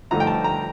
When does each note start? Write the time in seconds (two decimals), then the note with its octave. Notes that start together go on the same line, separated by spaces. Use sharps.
0.11 G2 D3 F3 A3 D#4 A#5
0.20 G5
0.27 A5
0.44 A#5